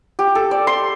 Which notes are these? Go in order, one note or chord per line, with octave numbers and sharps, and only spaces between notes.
G4
A4
D5
C6